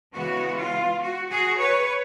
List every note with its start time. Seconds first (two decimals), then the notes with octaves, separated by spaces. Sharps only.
0.14 C#3 E3 G#3 B3 F#4
0.57 F4
1.01 F#4
1.30 F#4 G#4
1.58 B4 C#5